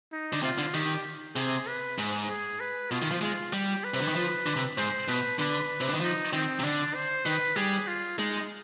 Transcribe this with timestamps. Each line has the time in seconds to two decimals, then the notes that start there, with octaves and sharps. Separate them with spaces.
0.12 D#4
0.33 D3
0.42 C3 F4
0.58 D3
0.74 D#3 G4
1.36 C3 G#4
1.67 B4
1.98 G#2
2.29 G#4
2.60 B4
2.91 B2 F4
3.02 D#3
3.11 F3
3.22 G#3 F4
3.53 G3 G4
3.84 B4
3.94 C3
4.00 D3
4.08 D#3
4.15 F3
4.46 D3
4.56 C3
4.77 G#2 C5
5.08 B2 B4
5.39 D3 B4
5.81 C3
5.87 D3
5.94 D#3
6.01 F3 D#4
6.33 D#3 C4
6.59 C3
6.63 D3 D4
6.94 C5
7.25 D#3 B4
7.56 G3 G#4
7.87 F4
8.19 G#3 D#4